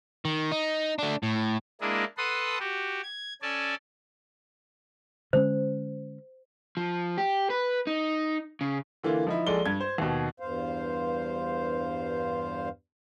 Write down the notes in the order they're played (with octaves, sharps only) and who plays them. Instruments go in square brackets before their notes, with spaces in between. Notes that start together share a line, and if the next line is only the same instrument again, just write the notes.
[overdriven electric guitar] D#3
D#4
A3 D4
A2
[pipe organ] G#3 A#3 D4 E4 G#4 A#4
A4 B4 F#5 C6 D#6
F#4 G4
G#6
C#4 A4 D5 G#5 A5
[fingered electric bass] D3 G#3 C#4 [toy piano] C5
[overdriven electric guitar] F3
G4
B4
D#4
C#3
[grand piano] D3 E3 A#3 F4
F3 D#4 E4
A#1 G#3 A4 D5 G7
G2 G#6
C5
D#2 B2
[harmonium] E2 G2 C5 F5